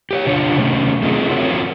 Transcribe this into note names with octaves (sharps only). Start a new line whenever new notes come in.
G4 C5 C#5
C#3 D4 F4 C#5
C3 D#3 A3 C#4
A3 C4 D#4 F4 F#4 G#4
C4 F4 F#4 A#4 C#5